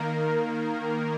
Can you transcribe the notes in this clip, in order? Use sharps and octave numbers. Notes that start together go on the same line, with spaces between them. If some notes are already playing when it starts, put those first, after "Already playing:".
Already playing: D#3 A#3 A#4